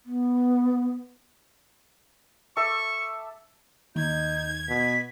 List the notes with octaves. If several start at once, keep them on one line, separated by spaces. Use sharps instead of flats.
B3
A4 E5 C#6 D6
D#2 D#4 G6 G#6
B2 B6